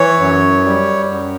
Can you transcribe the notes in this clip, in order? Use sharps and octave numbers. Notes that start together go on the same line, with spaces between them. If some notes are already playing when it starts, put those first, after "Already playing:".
Already playing: E3 C#5
F#2
G3
F#2